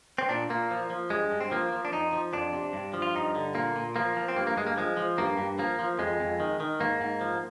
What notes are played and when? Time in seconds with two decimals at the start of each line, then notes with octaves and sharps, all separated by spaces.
0.18 C4
0.29 A#2 D4
0.49 A#2 A#3
0.71 F3
0.90 F3
1.10 G2 G#3
1.32 G2
1.41 C4
1.51 F3 A#3
1.72 F3
1.85 D4
1.92 F2 D#4
2.13 F3
2.33 F2 D4
2.53 C3
2.73 G2
2.94 F3
3.02 F4
3.15 G2 D#4
3.35 D3
3.55 A#2 A#3
3.76 A#2
3.96 F3 A#3
4.17 F3
4.28 C4
4.36 G2 A#3
4.47 A#3
4.56 G2 G#3
4.66 A#3
4.77 F3 G#3
4.97 F3
5.18 G2 A#3
5.38 G2
5.59 F3 A#3
5.79 F3
5.99 F2 G#3
6.20 F2
6.40 D#3
6.60 D#3
6.80 G#2 A#3
7.01 G#2
7.21 F3